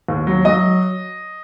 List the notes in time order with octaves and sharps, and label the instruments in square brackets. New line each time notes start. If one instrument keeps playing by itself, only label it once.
[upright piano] D#2
F#3
F#3 D#5